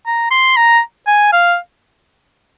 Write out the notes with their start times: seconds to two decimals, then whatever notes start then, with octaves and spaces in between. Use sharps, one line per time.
0.06 A#5
0.31 C6
0.56 A#5
1.07 G#5
1.33 F5